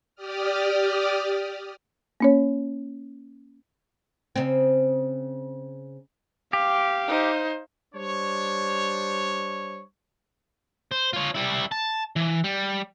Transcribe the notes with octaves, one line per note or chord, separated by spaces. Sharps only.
G4 D5 D#6 F6
A#3 C#4 C#5
C#3 C4
G4 F5
D#4 C5
G3 D4 C5 C#5
C5
F4 C#5
G3 E4
A5
E3
G3